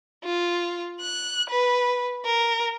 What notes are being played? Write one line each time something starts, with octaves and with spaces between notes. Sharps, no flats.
F4
F#6
B4
A#4